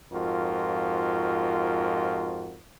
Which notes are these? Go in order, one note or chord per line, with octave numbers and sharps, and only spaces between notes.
F2 G#2 F4 F#4 A#4